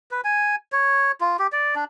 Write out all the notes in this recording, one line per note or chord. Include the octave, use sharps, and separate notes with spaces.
B4
G#5
C#5
F4
G4
D5
D4